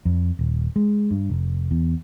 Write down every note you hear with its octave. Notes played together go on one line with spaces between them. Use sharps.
F2
D#1
G#3
G2
F1
E2